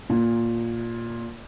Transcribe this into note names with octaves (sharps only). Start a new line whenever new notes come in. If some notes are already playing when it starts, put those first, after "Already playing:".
A#2